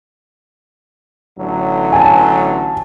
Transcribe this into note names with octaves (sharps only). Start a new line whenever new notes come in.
A1 D3 F#3
G#5 A5